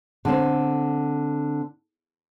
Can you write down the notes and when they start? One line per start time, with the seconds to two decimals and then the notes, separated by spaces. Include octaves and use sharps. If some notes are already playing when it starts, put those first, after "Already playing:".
0.25 D3 C4